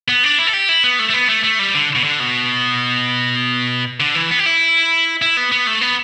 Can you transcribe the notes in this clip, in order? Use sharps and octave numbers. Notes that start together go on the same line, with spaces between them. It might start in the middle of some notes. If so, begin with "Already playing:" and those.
B3
D4
E4
A4
G4
E4
B3
A3
A3
B3
A3
A3
G3
D3
B2
D3
B2
D3
E3
B3
G4
E4
E4
B3
B3
A3
B3